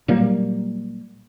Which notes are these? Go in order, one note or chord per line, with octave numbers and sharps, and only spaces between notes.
A#2 F#3 G3 A#3